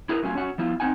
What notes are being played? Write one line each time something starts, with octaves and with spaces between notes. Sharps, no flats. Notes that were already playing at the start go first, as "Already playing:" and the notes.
E4 G#4 A#4 B4
F#3 A3 C#4 F4 G#5
C#4 F#4 F#5
F3 B3 E4 F4
C4 D#4 F#5 G#5